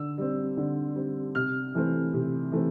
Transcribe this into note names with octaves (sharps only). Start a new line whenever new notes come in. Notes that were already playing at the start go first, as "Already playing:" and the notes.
Already playing: D3 E6
G3 C4
D3
G3 C4
C3 F6
E3 A3 C4
C3
E3 A3 C4